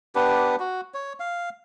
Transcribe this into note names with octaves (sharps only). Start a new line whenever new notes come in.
B3 D4 G4 B4
F#4
C#5
F5